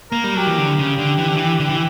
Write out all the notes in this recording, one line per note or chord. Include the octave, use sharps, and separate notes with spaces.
A#3 A#4
G3
F#3 G4
E3
D3
C#3
D3
E3
D3
E3
D3
E3